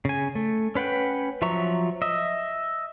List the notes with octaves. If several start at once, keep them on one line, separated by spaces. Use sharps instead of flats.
C#3 G#5
A3
C#4 B4 F#5 G5
F3 F#3 E5 A#5 C#6
D#5 E5